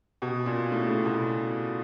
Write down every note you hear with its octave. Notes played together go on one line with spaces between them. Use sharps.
B2
A#2
A2
C#3
B2